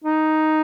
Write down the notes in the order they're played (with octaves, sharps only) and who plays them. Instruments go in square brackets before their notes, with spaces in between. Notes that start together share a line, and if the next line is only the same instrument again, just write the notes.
[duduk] D#4